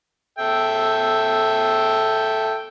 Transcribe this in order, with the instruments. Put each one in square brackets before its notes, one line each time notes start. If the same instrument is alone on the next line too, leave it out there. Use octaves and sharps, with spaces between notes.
[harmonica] A4 E5 G5